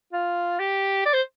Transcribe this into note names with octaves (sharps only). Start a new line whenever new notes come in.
F4
G4
D5
C5